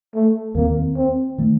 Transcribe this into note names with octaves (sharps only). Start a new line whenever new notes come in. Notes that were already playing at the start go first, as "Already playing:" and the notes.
A3
D#2 D#3 A3 A#3 C4
C4
D#3 A3